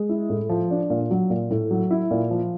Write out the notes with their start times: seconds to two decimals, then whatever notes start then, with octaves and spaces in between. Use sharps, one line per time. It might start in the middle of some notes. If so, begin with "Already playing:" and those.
Already playing: G#3
0.09 E4
0.30 A2
0.49 F3
0.70 D4
0.90 A#2
1.11 F#3
1.30 A#2
1.51 A2
1.71 F#3
1.91 E4
2.11 A#2
2.30 F3